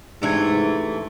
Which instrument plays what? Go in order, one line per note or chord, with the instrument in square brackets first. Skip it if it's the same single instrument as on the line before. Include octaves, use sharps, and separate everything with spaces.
[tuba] G#2 [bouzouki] C3 E3 A3 [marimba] D4 G#6